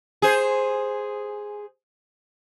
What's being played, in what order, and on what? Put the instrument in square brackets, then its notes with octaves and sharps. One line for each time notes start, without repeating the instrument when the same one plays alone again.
[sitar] G#4 C5